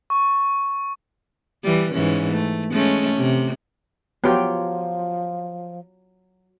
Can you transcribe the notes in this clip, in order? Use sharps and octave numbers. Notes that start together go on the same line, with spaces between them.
C#6
E3 G3
G#2 E3 C#4
A3
G#3 A3 C#4
C3
F3 F#3 B3 F4 G4 G5